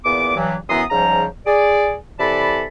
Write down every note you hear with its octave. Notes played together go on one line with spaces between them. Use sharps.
E2 A#2 B3 D6
G2 E3 F#3
F#2 E3 B3 A#5 C6 D#6
G#2 C#3 F3 G3 A#5
G#4 D5
C3 E3 A4 D5 A5 B5